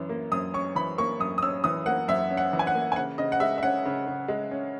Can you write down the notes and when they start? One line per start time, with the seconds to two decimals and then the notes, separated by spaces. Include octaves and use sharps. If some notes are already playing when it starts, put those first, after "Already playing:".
Already playing: F#2 E3 C#4
0.09 A#3
0.32 F#2 D#6
0.54 C#4 C#6
0.76 E3 B5
0.98 A#3 C#6
1.20 F#2 D#6
1.38 D#6
1.43 C#4 E6
1.64 E3 D#6
1.86 A#3 F#5
2.08 F#2 E5
2.31 C#4
2.37 F#5
2.53 E3
2.59 G#5
2.67 F#5
2.75 A#3
2.92 G#5
2.96 C#3 F#5
3.18 C#3 D#5
3.32 F#5
3.40 G#3 E5
3.58 E5
3.63 C#4 F#5
3.85 C#3
4.07 C#3
4.28 G#3
4.51 C#4